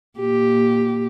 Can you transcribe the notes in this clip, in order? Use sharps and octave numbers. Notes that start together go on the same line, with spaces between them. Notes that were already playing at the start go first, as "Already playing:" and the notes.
A#2 G4